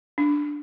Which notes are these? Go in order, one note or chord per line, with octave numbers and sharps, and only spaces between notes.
D4